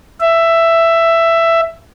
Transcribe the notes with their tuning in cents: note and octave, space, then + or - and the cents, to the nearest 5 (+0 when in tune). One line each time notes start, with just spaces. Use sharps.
E5 +10